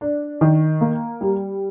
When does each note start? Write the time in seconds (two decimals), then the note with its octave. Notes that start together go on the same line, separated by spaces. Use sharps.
0.01 D4
0.41 D#3
0.81 A#3
1.21 G3